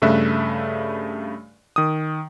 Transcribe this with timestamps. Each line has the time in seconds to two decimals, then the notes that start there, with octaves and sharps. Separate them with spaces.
0.02 G2 C#3 A3 E5 F#6
1.76 D#3 D#6